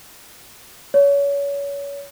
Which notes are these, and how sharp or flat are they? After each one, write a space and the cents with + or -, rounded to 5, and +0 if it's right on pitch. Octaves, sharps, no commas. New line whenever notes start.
C#5 +30